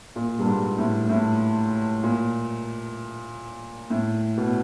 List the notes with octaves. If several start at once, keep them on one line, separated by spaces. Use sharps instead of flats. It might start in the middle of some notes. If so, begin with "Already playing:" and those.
A#2
G2
G#2
A2
A2
A#2
A2
B2